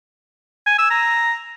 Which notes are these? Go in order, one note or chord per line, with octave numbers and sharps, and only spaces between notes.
G#5
E6
A#5